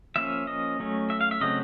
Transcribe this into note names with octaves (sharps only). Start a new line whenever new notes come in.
F3 A#3 C#4 E5
D#5
F#3 A3 C#4
E5
F5
E5
C#3 F#3 A3 C4 D#5